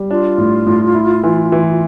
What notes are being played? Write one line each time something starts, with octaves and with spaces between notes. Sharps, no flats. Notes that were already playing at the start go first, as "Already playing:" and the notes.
Already playing: G3
D4 F4
A2
A2
E4
E3
E3